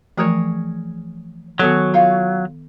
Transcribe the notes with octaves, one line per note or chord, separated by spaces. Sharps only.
E3 F3 A3 G#4 A#4 C#5
D#3 F#3 B3 F#4 G#4 A4 C#5
F4 C#5 F5